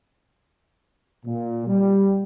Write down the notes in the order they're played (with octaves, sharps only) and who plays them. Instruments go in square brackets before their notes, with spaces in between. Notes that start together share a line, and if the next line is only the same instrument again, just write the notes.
[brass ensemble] A#2
G3